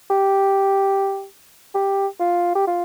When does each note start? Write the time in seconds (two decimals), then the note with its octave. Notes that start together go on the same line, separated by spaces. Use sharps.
0.10 G4
1.74 G4
2.20 F4
2.55 G4
2.67 F4